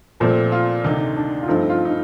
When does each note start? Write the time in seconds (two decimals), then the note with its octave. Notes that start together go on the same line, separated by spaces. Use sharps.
0.20 A#2 F3 A3 C4
0.52 F4
0.84 D2 C3 D#3 D#4
1.16 D4
1.42 F4
1.48 G2 F3 A3 C4 D#4
1.70 F4
1.85 D#4